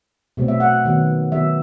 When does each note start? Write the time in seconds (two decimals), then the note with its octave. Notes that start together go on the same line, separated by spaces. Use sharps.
0.37 B2 F#3 A3 C4
0.48 E5
0.60 F#5
0.85 D#3 F#3 B3
1.32 D#3 F#3 B3 E5